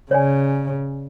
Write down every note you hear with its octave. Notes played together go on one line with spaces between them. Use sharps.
C#3 C#5 D5 G#5